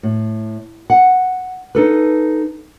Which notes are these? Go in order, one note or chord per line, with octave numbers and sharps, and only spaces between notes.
A2
F#5
D#4 A4 B4